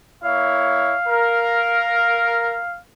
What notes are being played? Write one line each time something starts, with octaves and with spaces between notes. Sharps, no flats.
A#3 E4 C#5 F5
A#4